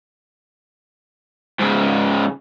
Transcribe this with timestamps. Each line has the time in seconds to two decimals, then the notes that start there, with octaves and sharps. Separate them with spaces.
1.60 G#2 C#3